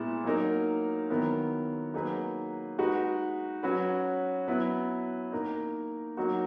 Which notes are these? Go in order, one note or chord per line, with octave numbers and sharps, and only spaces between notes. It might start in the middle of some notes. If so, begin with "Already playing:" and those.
Already playing: A#2 G#3 B3 E4
F#3 A#3 D#4 A#4
D#3 F#3 B3 E4 A#4
F#3 A#3 D#4 G#4 B4
G#3 D#4 F#4 B4
F#3 C#4 F#4 B4
F#3 B3 E4 B4
A#3 D#4 A#4
F#3 A#3 D#4 F#4